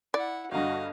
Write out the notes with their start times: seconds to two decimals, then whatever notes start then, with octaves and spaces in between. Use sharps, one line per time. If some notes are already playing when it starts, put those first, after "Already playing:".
0.14 E4 D5 F#5
0.51 G1 G2 F#4 D#5 F5